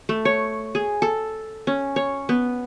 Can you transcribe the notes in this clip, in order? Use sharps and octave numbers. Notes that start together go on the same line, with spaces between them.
A3
C#5
G#4
A4
C#4
C#5
B3